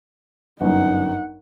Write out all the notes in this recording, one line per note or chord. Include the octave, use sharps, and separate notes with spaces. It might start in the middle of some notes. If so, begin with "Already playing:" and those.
G1 F#2 D#4 F#5